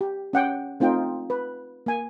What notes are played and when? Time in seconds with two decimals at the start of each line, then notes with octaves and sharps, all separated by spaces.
0.01 G4
0.33 C#4 F#5 G5
0.80 A3 C4 D#4 F4 G5
1.30 B4
1.86 A#3 G#5